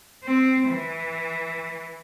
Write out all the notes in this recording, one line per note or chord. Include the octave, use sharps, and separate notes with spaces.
C4
E3